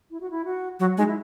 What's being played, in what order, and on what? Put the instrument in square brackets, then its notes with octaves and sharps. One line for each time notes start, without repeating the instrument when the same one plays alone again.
[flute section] E4
F#4
E4
F#4
[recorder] F#3 [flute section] F#4
[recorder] G#3 [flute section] D#4
[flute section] E4